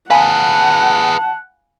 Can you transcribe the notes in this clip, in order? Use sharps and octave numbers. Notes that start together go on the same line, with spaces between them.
G#4 B4 F5 F#5 G#5 A5 B5